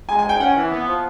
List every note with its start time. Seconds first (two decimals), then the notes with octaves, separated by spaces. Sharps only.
0.09 G#3 G#5
0.19 G#5
0.24 G#2 G5
0.40 C#4 F#5
0.56 E3
0.71 B3
0.86 F3